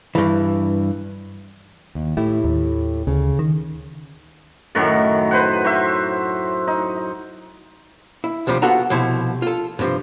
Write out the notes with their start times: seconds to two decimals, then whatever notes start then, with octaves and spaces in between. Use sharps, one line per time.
0.15 G2 E3
1.95 D#2
2.17 A2 A3 E4 G4
2.44 D#2
3.07 D2 C#3
3.39 D#3
4.75 F#2 A2 D#3 F#4
5.31 B4 C5 F#5
5.64 F#4 C5 E5
6.68 D#4
8.24 E4
8.47 D2 C3 F3 G3
8.62 B3 F4 F#4 A4 F#5 A#5
8.90 C2 B2 F3 E4 C5
9.42 F4 A4
9.79 G2 C3 F3